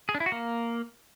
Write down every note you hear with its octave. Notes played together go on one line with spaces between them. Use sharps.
G#4
D4
E4
F#4
A#3